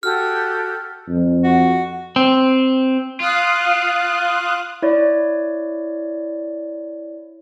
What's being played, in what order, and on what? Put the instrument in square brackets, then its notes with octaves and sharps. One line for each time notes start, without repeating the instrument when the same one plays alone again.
[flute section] F#4 G4 A4 [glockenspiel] E6 F6
[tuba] F2
[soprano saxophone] F#4
[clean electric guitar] C4
[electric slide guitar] F4 [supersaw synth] F5 D#6 F#6
[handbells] E4 C#5 D5